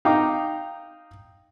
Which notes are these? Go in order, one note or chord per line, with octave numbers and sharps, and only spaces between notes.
D#4 F5 G5 A#5 D6